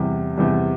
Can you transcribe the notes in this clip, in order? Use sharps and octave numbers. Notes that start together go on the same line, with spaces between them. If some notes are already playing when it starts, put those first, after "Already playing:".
Already playing: E2 C3 G3
E2 C3 G3